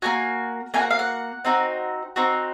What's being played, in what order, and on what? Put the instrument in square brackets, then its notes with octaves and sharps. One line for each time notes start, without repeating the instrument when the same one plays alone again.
[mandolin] A#3 D#4 F#4 G#5
A#3 D#4 G#5
F#4 F#5
F5
F#5
C4 D#4 F#4
C4 D#4 F#4